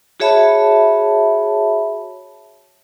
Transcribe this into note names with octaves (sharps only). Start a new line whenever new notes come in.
F#4 G#4 C#5 E5 A5 B5